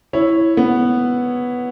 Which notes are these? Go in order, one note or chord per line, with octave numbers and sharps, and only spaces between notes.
E4 C#5
B3